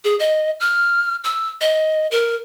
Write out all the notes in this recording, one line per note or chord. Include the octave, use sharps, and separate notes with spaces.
G#4
D#5
F6
E6
D#5
A#4